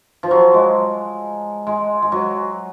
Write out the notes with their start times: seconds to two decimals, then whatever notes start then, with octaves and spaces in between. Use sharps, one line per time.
0.23 F3
0.31 F#3
0.54 G#3
1.67 G#3
2.02 G#3
2.12 F#3